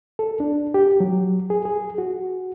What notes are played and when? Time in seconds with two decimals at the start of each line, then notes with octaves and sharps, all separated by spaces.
0.19 A4
0.40 D4
0.74 G4
1.00 F#3
1.50 G#4
1.65 G#4
1.98 F#4